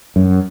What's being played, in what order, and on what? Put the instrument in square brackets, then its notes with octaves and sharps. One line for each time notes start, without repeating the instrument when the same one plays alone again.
[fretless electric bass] F#2